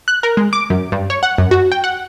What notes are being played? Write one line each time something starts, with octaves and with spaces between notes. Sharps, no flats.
F#6
A#4
G#3
D6
F#2
G2
C#5
F#5
F#2
F#4
G5
F#5